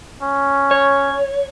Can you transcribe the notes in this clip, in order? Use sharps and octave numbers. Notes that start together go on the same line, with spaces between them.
C#4
C#5